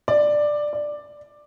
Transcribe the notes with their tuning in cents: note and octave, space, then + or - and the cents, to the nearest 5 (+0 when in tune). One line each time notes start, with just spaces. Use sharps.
D5 +10
D5 +5